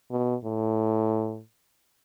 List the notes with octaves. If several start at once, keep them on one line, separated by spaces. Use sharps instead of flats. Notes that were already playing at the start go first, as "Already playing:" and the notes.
B2
A2